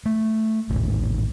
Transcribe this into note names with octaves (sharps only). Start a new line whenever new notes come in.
A3
A1 D#2 G#2 D#3